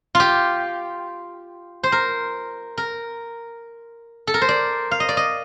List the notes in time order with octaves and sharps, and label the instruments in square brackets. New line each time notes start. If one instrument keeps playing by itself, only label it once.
[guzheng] F4
G4
C5
A#4
A#4
A4
A#4
C5
D5
F5
D#5
D5
D#5